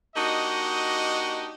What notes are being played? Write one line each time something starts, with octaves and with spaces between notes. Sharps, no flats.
A#3 D4 D#4 F#4 G4 D#5